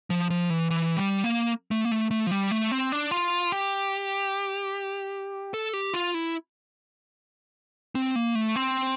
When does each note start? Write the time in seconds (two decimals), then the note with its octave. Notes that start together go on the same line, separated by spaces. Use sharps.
0.10 F3
0.30 F3
0.50 E3
0.70 E3
0.97 G3
1.24 A#3
1.71 A3
1.85 A#3
1.91 A3
2.11 A3
2.27 F3
2.31 G3
2.51 A3
2.71 C4
2.92 D4
3.11 F4
3.52 G4
5.54 A4
5.73 G4
5.94 F4
6.14 E4
7.95 C4
8.16 A#3
8.35 A3
8.56 C4